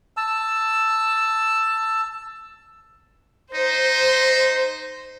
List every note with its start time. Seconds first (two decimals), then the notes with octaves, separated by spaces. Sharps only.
0.17 A5 E6
3.55 D#4 C5